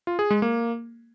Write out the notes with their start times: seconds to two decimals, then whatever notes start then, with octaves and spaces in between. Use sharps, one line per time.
0.07 F4
0.19 G#4
0.30 G#3
0.42 A#3